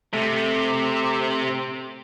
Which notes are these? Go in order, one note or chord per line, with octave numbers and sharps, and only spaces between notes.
C3 A3